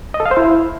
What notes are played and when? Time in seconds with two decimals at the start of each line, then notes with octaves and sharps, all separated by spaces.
0.14 D#5
0.20 A4
0.26 F5
0.31 C5
0.37 E4